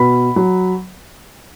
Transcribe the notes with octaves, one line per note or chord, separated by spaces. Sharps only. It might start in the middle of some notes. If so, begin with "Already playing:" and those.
Already playing: B2 B5
F#3